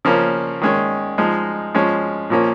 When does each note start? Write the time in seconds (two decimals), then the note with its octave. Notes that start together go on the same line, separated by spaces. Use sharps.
0.05 C#3 F3 A#3 C#4
0.61 D#3 G#3 C#4
1.18 F3 G#3 D#4
1.75 F3 G#3 C#4
2.30 A#2 F3 A#3 C#4